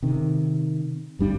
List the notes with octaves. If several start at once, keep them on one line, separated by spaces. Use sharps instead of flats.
C3 D#3
G1 G3 D4